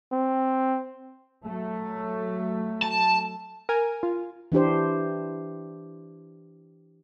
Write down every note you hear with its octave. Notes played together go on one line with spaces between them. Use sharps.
C4
F#3 A3
A5
A#4 G#5
F4
E3 D4 G4 C5